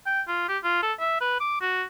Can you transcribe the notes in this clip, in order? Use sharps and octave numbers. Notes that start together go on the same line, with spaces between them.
G5
F4
G4
F4
A4
E5
B4
D6
F#4